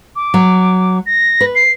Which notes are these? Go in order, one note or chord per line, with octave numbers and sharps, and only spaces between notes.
D6
F#3
A#6
B4
C7